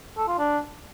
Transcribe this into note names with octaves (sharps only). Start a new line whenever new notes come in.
A4
F4
D4